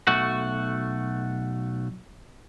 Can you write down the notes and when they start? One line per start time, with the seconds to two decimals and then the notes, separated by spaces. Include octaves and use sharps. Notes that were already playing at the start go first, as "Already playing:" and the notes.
0.07 B1 A3 F#4